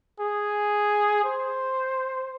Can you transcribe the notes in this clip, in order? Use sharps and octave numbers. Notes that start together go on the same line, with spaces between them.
G#4
C5